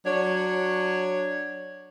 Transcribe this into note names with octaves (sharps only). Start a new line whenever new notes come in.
F#3 D4 C#5